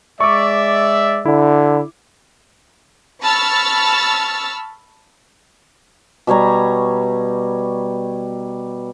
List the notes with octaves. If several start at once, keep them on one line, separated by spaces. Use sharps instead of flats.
G#3 D5 E5 C#6 D6
D3 E4
A5 B5 C#6 E6 F6 A6
B2 G3 C#5 A#5